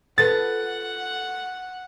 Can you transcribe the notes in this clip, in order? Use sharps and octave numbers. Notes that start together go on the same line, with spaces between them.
F4 A4 B4 F#5 A6